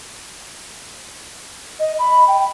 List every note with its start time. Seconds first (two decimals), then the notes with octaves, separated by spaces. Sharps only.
1.79 D#5
1.99 B5
2.28 G5